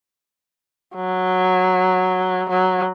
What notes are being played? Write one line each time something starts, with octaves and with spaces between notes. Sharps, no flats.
F#3
F#3